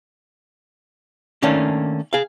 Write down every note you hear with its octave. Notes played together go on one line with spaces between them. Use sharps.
D#3 A3 A#3 C#4 D4
G#4 F5